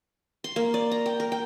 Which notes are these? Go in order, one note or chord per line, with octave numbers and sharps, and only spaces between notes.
C6
A#3
D5
A#5
G5
A#4
G5